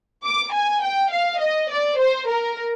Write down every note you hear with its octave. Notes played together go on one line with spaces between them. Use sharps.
D6
G#5
G5
F5
D#5
D5
C5
A#4